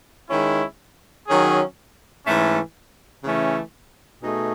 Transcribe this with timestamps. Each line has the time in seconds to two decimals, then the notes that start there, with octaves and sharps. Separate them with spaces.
0.29 D#3 G#3 C#4 E4
1.27 D#3 F#3 C#4 G#4
2.26 G#2 E3 A3 C#4
3.24 C#3 E3 A3 C#4
4.23 B2 A3 D#4 G#4